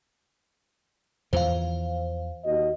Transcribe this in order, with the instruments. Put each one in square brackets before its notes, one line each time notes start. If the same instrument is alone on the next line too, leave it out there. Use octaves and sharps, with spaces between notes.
[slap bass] E2 E3 F3 [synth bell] C5 F5
[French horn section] D#2 F#4 D#5